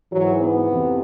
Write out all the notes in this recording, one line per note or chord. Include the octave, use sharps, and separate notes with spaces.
G#2 E3 F#3
B3
F2 C3 E3